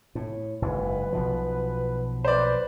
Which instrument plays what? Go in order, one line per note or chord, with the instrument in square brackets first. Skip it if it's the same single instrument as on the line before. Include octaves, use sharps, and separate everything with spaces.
[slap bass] A2
[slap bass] F#1 G#2 [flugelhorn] B4
[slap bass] B1 B2 F3
[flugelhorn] B4 [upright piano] C5 D5